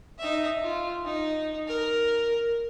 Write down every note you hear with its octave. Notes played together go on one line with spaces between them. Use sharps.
D#4 E5
F4
D#4
A#4